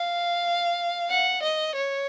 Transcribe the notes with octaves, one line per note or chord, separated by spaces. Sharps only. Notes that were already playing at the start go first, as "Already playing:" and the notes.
Already playing: F5
F#5
D#5
C#5